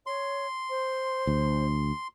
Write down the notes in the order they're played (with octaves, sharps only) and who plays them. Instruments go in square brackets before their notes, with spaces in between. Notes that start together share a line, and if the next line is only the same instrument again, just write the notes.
[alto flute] C#5 [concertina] C6
[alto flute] C5
[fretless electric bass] D2